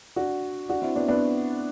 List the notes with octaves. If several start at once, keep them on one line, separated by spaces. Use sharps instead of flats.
D4 F#4
D4 F#4
C4 E4
B3 D4
B3 D4